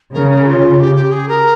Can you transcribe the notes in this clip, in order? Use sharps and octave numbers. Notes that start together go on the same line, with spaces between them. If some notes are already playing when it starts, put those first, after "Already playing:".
C#3 A#4
A#4
F4
G4
G4
G#4
A#4